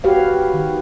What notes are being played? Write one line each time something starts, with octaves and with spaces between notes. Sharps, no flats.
F#4 G4 B4 C#5 F5
D#3